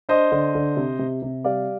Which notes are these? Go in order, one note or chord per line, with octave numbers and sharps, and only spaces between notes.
D4 C5 D#5
D3
D3
C3
C3
C3
G3 D5 F5